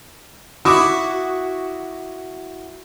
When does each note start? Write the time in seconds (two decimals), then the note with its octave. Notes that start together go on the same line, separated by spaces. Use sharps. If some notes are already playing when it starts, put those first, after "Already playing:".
0.65 E4 F#4 D6 D#6